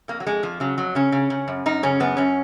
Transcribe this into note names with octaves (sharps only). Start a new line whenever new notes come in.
F2 A#3
F#3
F2 G#3
F2 F3
C#3 F#3
F2 F#3
C#3 C#4
C#3
C#3
F#2
F#2 D#4
C#3 C#4
F#2 B3
F#2 C#4